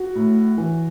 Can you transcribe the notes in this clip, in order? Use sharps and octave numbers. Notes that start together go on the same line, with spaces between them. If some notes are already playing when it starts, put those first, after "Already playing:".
Already playing: F#4
A2
E3